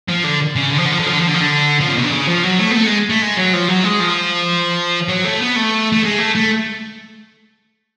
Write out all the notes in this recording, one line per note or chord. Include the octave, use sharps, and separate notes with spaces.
F3
D3
C#3
D3
F3
D3
F3
D3
F3
D3
F3
D3
F3
D3
F3
C#3
B2
D3
C#3
F3
F#3
A3
B3
A3
G#3
A3
G#3
F#3
F3
F#3
G#3
F3
F#3
A3
B3
A3
A3
G#3
A3
A3